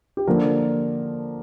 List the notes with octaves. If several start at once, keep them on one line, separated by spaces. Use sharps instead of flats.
G4
D3 F3 A#3 A#4